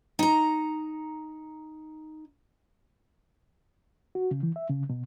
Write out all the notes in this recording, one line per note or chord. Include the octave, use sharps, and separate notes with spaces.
D#4 A#5
F#4
C#3
E3
E5
C#3
B2